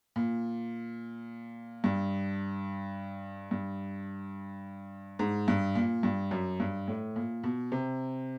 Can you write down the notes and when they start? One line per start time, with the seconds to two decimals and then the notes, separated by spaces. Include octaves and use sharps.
0.16 A#2
1.84 G2
3.51 G2
5.19 G#2
5.48 G2
5.75 A#2
6.03 G2
6.31 F#2
6.60 G2
6.88 A2
7.16 A#2
7.44 B2
7.72 C3